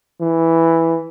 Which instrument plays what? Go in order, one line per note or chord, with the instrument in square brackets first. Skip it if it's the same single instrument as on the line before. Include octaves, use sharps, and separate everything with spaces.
[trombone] E3